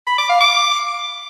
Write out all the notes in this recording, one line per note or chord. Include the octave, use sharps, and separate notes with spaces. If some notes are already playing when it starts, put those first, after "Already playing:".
B5
D6
F5
D6